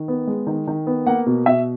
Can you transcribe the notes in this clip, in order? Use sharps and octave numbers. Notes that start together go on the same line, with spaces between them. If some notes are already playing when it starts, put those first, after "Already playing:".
Already playing: D#3
B3
G#3
D#3
D#3
B3
A#3 F#5
B2
B2 E5